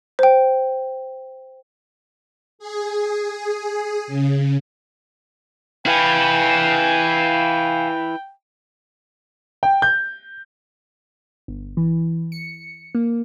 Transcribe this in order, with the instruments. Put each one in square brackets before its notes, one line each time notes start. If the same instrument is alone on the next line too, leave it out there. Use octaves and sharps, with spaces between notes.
[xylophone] C5 G5
[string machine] G#4
C#3
[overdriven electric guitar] E4 B4 [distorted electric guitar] F5 G#5 [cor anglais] G5
[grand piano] G5
G6
[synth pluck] G1
E3
C#7
A#3